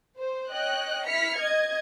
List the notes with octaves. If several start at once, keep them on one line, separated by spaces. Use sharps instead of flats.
C5
C#5 D#5 G5 F#6
E4 F6 B6 C#7
D#5 G#6